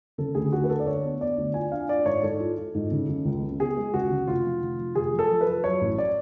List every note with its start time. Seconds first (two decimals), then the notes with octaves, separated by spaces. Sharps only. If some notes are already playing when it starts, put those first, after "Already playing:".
0.18 C#3 A4
0.35 D2 G#4
0.52 D2 F#4
0.64 B4
0.69 D2 A4
0.80 D5
0.86 D2 C#5
1.03 B3
1.21 B3 D5
1.37 D2
1.54 F4 G#5
1.72 D4 F5
1.88 F4 D5
2.05 G#2 C#5
2.23 G#2 A4
2.40 F4
2.57 F4
2.75 G#2
2.91 C#3
3.08 C#3
3.25 C#2
3.42 C#3
3.59 B3 G#4
3.77 G#3
3.94 C#2 F#4
4.11 C#3
4.27 F1 F4
4.45 F3
4.62 F1
4.79 F3
4.95 F1 G#4
5.13 F3
5.19 A4
5.30 F3
5.41 B4
5.47 F3
5.64 F#3 C#5
5.81 A1
5.98 D5